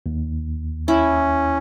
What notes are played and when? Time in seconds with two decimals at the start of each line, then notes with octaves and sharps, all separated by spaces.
0.06 D#2
0.88 C#4 E4